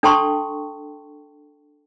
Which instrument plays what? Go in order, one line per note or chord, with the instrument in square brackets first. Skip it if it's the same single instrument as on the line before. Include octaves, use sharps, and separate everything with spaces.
[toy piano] D4 A4 G5 A5 C6 C#6